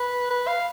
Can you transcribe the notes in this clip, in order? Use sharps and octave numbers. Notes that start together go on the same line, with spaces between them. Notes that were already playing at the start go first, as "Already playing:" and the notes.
Already playing: B4
B4
F5